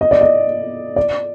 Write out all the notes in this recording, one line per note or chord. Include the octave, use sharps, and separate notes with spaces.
D#5
D5
D#5
D5